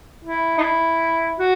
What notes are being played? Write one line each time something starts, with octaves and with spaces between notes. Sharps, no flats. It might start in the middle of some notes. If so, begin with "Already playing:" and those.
E4
D#4
E4
F#4